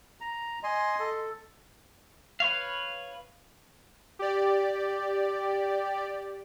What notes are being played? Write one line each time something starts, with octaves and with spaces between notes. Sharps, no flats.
A#5
D#5 G#5 C6
A4
B4 C#5 F5
G4 D5